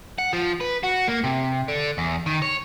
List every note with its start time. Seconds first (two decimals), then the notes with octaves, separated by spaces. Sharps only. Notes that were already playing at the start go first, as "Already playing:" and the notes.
0.18 F#5
0.33 F3
0.60 B4
0.83 F#4
1.08 A#3
1.24 C3
1.68 D3
1.98 E2
2.26 D#3
2.42 C#5